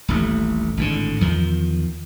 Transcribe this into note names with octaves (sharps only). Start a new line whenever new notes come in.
D#1 A1 A3
G#1 A2 D3
E2 D#3 F3